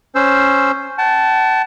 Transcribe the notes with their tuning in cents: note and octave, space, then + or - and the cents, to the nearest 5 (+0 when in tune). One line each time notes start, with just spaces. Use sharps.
C#4 -5 C5 +0 E6 +0
F#5 +40 A5 -10